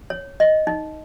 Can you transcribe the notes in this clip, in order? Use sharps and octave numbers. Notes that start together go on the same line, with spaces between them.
C#5
D#5
D#4